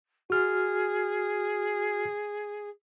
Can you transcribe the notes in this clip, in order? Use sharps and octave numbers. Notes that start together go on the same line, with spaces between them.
F#4 G#4 F6